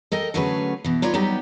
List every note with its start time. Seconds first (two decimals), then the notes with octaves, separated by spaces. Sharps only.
0.12 A4 A#4 D#5 G5
0.34 D3 F#3 A3 C#4 G#4 B4
0.84 B2 E3
1.02 D#4 F4 B4 C#5 D5
1.14 F#3 G3 B3 D#4 G4